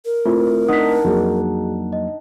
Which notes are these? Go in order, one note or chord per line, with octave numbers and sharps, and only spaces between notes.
A#4
A3 C4 E4 F4
D4 D#4 F#5 D#6 B6
F2 F#3 A#3 F#4 G#4
D#5